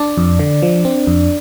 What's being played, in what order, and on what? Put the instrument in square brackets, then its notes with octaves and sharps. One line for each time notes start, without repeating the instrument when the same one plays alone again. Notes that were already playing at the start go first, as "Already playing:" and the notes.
Already playing: [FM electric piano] D4 D5
F2
D3
F3
C4
F2